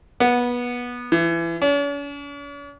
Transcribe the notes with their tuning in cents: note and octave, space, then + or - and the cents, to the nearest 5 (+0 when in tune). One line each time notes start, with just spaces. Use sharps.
B3 -20
E3 +25
C#4 +45